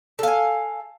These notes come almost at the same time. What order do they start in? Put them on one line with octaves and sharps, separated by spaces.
A4 F5 G#5